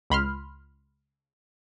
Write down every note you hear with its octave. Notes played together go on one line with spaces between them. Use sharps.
C#2 B5 C6 F6